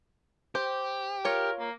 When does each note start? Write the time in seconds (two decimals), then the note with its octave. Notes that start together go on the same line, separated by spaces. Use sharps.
0.55 G4 C5
1.25 F4 A#4 C#5
1.59 A#3